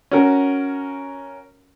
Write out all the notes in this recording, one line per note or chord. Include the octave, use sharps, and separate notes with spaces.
C#4 F#4 A#4